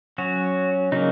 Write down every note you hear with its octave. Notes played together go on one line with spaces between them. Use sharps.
F#3 C#4 F#4
C#3 F#3 A#3 C#4 D#4